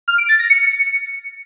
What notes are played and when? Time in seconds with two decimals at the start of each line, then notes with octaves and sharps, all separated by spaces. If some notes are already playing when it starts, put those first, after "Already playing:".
0.08 F6
0.18 D7
0.29 A6
0.39 A#6
0.50 C#7